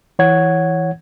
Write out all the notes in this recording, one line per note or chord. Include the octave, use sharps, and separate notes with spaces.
E3 C#5 F#5 G#6